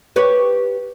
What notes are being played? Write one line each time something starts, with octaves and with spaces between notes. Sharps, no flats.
G4 B4 C#5